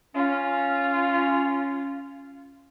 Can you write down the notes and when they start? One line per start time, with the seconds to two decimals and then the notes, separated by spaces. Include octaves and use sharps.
0.15 C#4 F4